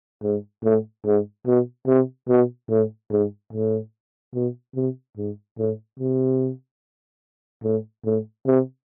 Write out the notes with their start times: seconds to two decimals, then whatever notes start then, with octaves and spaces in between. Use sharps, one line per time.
0.23 G#2
0.64 A2
1.05 G#2
1.47 B2
1.87 C3
2.29 B2
2.70 A2
3.11 G#2
3.53 A2
4.34 B2
4.76 C3
5.17 G#2
5.59 A2
6.00 C3
7.64 A2
8.05 A2
8.47 C3